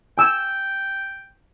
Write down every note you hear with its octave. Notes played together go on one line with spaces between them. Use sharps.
G5 G#5 E6